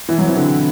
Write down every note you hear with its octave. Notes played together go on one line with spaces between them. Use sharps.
B2 E3
F#3
E3 C4
D3
E4